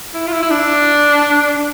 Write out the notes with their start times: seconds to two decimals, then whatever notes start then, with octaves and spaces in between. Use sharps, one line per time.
0.14 E4
0.27 F4
0.32 E4
0.42 E4
0.51 D4